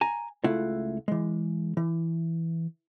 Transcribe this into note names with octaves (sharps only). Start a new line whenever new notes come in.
G#5 A#5
C#2 A3 E4 F4 F#5
E3 G#3
E3